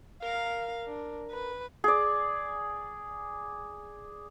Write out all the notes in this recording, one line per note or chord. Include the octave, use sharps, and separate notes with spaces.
A#4 F5
D4
B4
G#4 D5